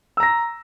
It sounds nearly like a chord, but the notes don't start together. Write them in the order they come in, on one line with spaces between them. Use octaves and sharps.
E6 A#5 A#6